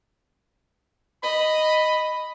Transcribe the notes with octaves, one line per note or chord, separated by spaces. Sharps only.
D#5 B5